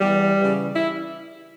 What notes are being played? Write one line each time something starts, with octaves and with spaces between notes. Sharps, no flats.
E2 G3
C#3 E3
E4